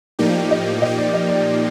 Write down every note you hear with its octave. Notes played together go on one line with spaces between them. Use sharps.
A2 F3 A#3 D#4 G4 D5
D#5
A#2 F3 A#3 D#4 G4 D#5
D5
D#5
D5